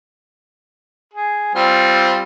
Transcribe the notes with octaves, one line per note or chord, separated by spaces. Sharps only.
G#4
G3 C4 F4